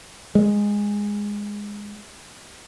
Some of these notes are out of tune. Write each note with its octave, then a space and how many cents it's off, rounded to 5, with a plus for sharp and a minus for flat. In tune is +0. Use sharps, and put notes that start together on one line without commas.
G#3 -10